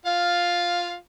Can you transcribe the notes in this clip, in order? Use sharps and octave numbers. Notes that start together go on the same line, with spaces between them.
F4 F5